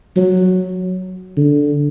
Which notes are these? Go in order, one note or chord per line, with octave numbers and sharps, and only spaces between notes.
F#3
D3